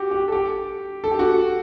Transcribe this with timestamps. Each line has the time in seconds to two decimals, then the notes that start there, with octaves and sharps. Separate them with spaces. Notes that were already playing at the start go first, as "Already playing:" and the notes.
Already playing: F#4 G4
0.11 G4
0.28 A4
0.32 G4
1.04 A4
1.11 G4
1.19 F#4